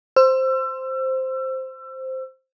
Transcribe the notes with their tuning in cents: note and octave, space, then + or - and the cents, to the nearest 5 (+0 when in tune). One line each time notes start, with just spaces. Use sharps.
C5 +0 E6 +30